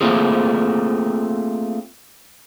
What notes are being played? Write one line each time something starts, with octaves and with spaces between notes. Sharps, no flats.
A3 A#3 C4 F4 G#4